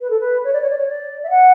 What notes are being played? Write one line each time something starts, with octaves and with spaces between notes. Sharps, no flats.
B4
A4
B4
C#5
D5
C#5
D5
C#5
D5
E5
F#5